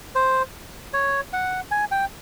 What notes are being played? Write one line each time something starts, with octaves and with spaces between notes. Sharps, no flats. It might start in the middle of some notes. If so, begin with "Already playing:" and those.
C5
C#5
F#5
G#5
G5